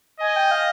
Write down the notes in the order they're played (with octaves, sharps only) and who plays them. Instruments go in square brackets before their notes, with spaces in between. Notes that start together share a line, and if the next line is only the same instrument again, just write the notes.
[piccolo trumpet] D#5 [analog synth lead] G#5
[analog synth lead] G5
F5